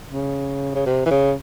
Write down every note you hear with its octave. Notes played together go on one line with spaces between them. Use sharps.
C#3
C#3
C3
E3
C#3